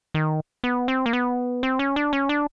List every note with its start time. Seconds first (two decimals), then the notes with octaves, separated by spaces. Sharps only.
0.14 D#3
0.64 B3
0.88 C4
1.06 A#3
1.13 B3
1.63 C4
1.79 C#4
1.96 D4
2.13 C#4
2.29 D4